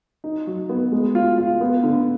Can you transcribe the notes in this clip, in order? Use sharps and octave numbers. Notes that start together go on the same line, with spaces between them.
D#4
F#3
B3
G#3
F4
F4
B3
D3